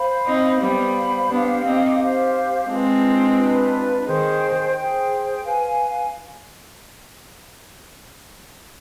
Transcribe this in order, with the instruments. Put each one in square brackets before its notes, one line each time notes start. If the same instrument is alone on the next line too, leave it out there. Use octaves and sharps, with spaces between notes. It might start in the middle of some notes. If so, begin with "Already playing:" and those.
Already playing: [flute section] C5 F5 B5
[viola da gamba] C4 D#4
[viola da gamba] G3 B3 [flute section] C5 F5 B5
[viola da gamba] B3 D4 [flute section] G4 C5 F5
[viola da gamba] C4 D#4
[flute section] G4 C5 F5
[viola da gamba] G#3 C4 [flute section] D4 F4 B4
[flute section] D4 F4 B4
[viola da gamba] D#3 [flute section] G#4 C5 G5
[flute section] G#4 C5 G5
B4 F5 G#5